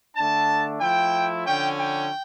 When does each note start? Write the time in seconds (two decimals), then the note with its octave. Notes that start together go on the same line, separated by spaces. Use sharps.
0.16 D3 A3 D4 A5
0.80 F3 A3 E4 G5
1.45 D3 F3 C#4 G5
1.79 G5